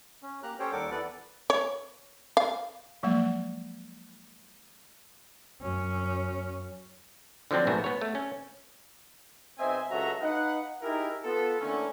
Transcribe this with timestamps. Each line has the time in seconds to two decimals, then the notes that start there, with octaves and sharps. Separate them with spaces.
0.23 C#4
0.43 A#3 G4 A#5 F#6
0.59 C#4 G4 A4 C5 C#5 G5
0.72 D#2 G3 A4 A#4 F#5 D6
0.91 E3 B3 A4 B4 D5
1.50 C#5
2.37 F5
3.03 F3 F#3 G#3 A#3
5.62 F#2 C#4
7.51 D3 F3 F#3 C4 D4
7.67 A#1 G#2 A3 B3 F#4
7.84 B3 C#5
8.01 A3
8.15 C#4
9.59 B1 C4 C5 D#5 E5 G#5
9.91 C#2 F#3 F#4 A4 E5 A#5
10.21 D#4 B4 D#5 F5 F#5
10.82 D#4 E4 G4 G#4 A#4
11.23 B3 F4 A4
11.60 D3 E3 A3 A#3 C#4